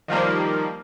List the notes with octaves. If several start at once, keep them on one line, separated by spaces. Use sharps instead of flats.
D#3 F3 G3 A#3